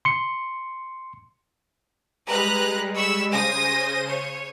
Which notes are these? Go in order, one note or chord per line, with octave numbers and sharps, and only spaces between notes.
C6 C#7
G3 G#3 B4 A#5 F#6
B5 C#6 E6
C#3 C5 G#5 D#6 A#6 D#7
C#5